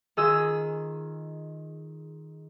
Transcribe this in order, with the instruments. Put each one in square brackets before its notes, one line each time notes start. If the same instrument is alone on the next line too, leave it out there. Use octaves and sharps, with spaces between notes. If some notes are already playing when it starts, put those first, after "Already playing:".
[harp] D#3 F4 G#4 D#5 E6